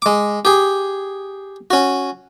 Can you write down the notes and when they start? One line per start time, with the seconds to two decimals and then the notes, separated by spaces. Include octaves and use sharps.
0.02 G#3 D6
0.45 G4 G#4
1.70 C#4 F#4